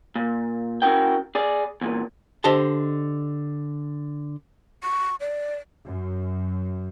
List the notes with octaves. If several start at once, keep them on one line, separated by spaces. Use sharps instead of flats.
A#2
C#4 E4 F#4 A#4 G5
G#4 D5
E2 A#2
D3 G4 C5 D#5 A5
C#6
D5
F#2